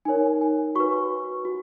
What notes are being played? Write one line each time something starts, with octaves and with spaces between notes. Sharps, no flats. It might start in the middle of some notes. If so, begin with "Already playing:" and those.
D#4 A#4 C#5 G#5
G#5
F#4 B4 C#6
F#4